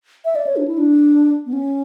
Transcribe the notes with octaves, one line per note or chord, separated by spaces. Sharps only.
E5
D5
C#5
D4
E4
D4
B3
C#4